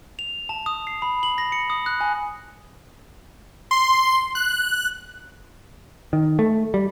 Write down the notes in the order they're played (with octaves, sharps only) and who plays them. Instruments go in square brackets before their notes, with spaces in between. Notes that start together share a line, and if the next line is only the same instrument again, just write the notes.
[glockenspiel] F7
A5
D#6
C7
B5
F#7
A#6
C#7
D#6
F#6
G#5
[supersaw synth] C6
F#6
[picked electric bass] D#3
A3
G3